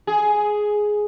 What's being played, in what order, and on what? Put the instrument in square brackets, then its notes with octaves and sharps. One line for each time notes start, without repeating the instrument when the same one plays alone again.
[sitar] G#4